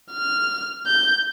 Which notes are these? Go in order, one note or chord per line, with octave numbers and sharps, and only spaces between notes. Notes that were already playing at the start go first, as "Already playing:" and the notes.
F6
G6